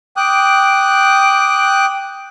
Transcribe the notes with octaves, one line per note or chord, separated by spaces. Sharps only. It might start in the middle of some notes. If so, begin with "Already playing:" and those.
G5 D6 D#6 F#6